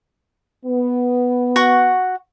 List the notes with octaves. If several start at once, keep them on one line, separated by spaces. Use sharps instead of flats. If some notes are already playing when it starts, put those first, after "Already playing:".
B3
F#4 F#5 C#6